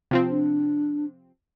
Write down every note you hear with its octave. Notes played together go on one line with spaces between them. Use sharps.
C3 F3 C4
D4